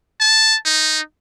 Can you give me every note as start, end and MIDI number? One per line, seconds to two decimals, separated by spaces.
0.20 0.56 81
0.65 0.99 63